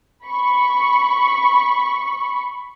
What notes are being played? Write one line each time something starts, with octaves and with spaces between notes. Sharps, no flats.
B5 C#6